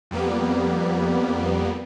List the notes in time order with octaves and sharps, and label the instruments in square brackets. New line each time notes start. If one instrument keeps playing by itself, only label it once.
[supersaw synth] F2 G3 A#3 B3